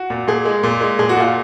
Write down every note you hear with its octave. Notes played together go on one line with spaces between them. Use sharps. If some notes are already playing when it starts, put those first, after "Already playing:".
Already playing: F#4
A#2
A#2 G#4
G#3
A#2
G#3
A#2 G#4
F#4
A#2 F4